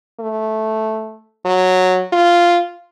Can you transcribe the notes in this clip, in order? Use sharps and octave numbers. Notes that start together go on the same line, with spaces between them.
A3
F#3
F4